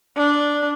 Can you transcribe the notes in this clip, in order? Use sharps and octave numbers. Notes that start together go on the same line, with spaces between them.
D4